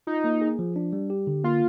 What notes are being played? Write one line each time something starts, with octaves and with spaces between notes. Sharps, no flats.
D#4 F4
A#3
G#4
F3
D4
G3
G4
D3
A#3 F4